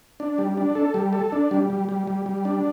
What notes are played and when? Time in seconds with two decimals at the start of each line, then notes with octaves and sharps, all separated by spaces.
0.20 D4
0.38 G3
0.57 D4
0.75 A4
0.94 G3
1.13 A4
1.32 D4
1.51 G3
1.70 G3
1.89 G3
2.07 G3
2.26 G3
2.45 D4